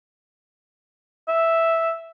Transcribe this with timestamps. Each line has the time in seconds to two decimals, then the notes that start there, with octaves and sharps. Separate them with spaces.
1.28 E5